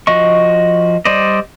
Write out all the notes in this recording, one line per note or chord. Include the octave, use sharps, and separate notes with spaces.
F3 F#4 D#5 C#6
G3 C5 D5 D#5